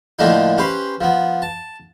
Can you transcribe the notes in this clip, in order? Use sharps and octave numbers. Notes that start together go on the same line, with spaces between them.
A2 D3 F3 A#3 D4 D#4
C#4 G4 B4 C5 C6
F3 B3
A5